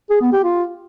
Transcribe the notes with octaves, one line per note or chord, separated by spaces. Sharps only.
G#4
B3
G4
F4